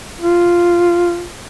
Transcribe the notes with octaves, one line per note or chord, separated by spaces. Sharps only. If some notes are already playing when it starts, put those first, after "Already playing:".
F4